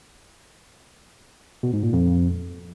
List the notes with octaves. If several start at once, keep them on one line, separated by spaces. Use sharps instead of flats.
B2
G#2
A#2
F2